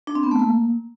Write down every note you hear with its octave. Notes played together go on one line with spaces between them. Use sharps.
D4
C4
B3
A3
A#3